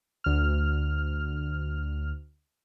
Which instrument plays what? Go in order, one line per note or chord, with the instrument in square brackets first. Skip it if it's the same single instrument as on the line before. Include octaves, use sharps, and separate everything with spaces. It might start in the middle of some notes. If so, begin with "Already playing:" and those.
[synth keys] D2 F6